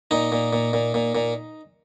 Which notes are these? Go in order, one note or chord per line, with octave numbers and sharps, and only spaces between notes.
A#2 D#4
A#2
A#2
A#2
A#2
A#2